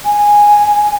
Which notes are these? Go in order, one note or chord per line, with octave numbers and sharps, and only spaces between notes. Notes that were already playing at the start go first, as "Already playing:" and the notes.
G#5